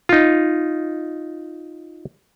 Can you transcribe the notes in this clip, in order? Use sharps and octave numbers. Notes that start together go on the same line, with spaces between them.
D#4 F4